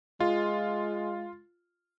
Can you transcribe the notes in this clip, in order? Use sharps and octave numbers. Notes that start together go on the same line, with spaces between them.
G#3 F4